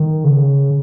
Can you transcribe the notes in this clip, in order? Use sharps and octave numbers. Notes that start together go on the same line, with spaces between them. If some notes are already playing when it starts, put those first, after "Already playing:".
Already playing: D#3
C#3